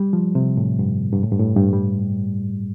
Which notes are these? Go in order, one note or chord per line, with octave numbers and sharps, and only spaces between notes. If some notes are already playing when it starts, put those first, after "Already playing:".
Already playing: G3
F3
C3
A2
G2
G2
A2
G2
A2
G2
G3